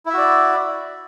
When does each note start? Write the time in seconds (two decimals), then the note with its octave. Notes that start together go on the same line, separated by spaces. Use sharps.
0.06 E4
0.10 E5
0.14 F#4
0.17 D5